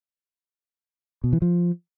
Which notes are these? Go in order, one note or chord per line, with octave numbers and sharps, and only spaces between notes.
B2
E3
F3